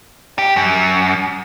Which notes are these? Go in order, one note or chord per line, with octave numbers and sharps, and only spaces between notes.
G4
F#2